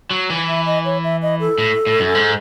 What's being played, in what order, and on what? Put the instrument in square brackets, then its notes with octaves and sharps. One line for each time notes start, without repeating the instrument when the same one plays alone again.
[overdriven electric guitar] F#3
E3
[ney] E5
D#5
C#5
E5
D#5
A4
[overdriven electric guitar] A2
A2
F#2
G#2